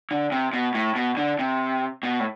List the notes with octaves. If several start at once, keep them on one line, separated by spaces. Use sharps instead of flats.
D3
C3
B2
A2
B2
D3
C3
B2
A2